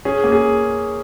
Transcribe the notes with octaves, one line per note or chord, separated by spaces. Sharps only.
C#4 G#4
A#3
G#4